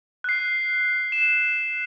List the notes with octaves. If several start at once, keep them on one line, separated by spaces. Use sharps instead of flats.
F#6 C7
E7